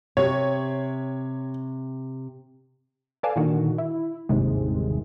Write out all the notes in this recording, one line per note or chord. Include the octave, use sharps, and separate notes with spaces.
C3 C#5
A4 B4 D5 F5 G#5 A5
A#2 D3 D#3 F#4
E4
G1 D#2 G#2 C3 G#3